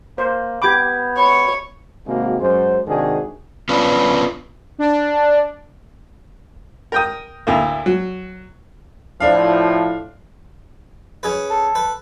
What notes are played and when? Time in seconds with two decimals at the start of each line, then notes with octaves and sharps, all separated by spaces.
0.18 A#3 C5
0.62 B3 G4 B5 D6 G6 G#6
1.18 C#5 B5
2.06 G#1 C3 G#3 A#3 F#4
2.40 F#2 G#3 C5
2.87 G#2 C3 D#3 D4 F#4 G#4
3.69 B3 C#4 D4 F4 B4
4.79 D4
6.92 A#4 G5 D#6
7.47 D2 A2 A#3
7.86 F#3
9.20 A2 F3 D4 F5
11.23 C#4 G#4 B4
11.50 A4
11.75 B4